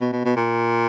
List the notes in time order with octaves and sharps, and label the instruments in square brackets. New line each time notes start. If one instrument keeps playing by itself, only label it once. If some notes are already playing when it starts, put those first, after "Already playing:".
[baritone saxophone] B2
B2
B2
A#2